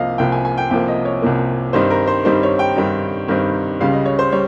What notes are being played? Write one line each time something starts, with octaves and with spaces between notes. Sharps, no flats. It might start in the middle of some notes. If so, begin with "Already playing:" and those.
Already playing: C2 C3 F3 A#3 D#5 F5
C2 C3 F3 A#3 G5
G#5
G#5
G5
C2 C3 F3 A#3 G5
D#5
C#5
C2 C3 F3 A#3
G2 D#3 G3 C4 D#4 C5
A#4
C5
G2 D#3 G3 C4 D#4 C5
C#5
G5
G2 D#3 G3 C4 D#4
G2 D#3 G3 C4 D#4
C#2 C#3 G3 F5
D#5
C#5
C5
G3 C#5